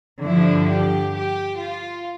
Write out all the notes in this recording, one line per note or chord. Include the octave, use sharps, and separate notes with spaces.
G2 D3 F3 E4
G4
G4
F4